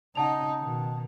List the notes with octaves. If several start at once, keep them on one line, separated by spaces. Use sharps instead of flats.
C#3 D#4 F#5 A5 F7
B2 D#3